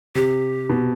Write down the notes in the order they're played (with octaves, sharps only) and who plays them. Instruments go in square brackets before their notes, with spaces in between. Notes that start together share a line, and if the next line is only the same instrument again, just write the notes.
[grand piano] C3 [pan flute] G4
[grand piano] B2